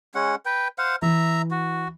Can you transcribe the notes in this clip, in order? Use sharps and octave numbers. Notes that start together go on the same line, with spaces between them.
G#3 C#4 F#5
B4 G5
C5 F5 F#5
E3 E5 A#5
F#4